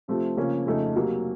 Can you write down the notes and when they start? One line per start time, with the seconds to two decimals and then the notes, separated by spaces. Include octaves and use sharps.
0.08 C3 F3 A3 C4
0.37 C#3 F3 A#3 C#4
0.66 F2 C#3 A3 D#4 A4
0.96 C3 F#3 A#3